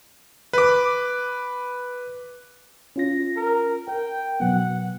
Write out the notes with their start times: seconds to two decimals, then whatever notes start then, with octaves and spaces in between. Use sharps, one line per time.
0.53 B4 D6
2.96 C#4 F4 A#6
3.37 A#4
3.88 A#4 G5
4.40 B2 F#3 B3 F#5